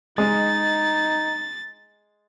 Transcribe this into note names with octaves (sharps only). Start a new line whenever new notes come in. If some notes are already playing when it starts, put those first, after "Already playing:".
G#3 D#4 A6